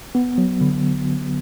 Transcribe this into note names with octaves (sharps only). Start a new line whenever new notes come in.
B3
F#3
D3